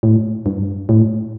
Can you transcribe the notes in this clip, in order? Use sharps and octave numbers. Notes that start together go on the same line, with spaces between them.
A2
G2
A2